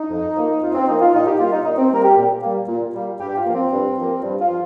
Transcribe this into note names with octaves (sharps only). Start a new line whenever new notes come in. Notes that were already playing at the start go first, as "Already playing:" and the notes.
Already playing: D#4
F2
F3 A#3
F2 F4
C4
F3 A#3 D#4
F4
A#2 D#4
G4
G3 A#3 F4
D#4
A#2 D#4
C4
G3 A#3 A#4
G4
A#2
G3 A#3
A#2
G3 A#3
G2 G4
F4
F3 A#3
C4
G2
F3 A#3
G2
F4
F3